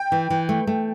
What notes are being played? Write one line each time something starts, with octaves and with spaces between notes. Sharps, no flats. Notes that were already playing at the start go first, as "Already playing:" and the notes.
Already playing: G5
E3
E3
A3
A3